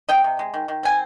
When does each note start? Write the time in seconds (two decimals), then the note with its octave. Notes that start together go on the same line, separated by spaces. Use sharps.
0.09 C4 D#5 G5
0.24 C3
0.39 G#3
0.54 D#3
0.68 D#3
0.83 C4 G#5